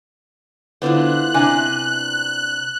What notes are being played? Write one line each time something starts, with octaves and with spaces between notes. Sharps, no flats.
D3 B3 E4 F4 C5 F#6
C3 D4 G#5